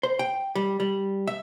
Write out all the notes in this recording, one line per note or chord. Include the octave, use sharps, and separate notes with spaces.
C5
G5
G3
G3
E5